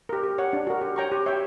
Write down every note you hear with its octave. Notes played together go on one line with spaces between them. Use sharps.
G4 A#4
G4
C#5 F#5
D4
F#4 A#4
G4
C#5 G5 A#5 C#6
G4
C#5 E5 G5